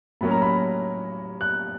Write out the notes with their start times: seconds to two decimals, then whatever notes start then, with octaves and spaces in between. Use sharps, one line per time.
0.21 A2 F#3 A#3 C#4 B5
0.31 A#5
0.42 B5
1.41 F#6